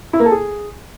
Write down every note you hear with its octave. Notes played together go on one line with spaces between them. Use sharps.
E4
A#3
A4
G#4